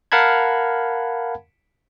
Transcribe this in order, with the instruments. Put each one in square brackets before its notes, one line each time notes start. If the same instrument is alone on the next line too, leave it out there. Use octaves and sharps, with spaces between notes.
[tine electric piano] A#4 F5 F#5 A5 B5 G#6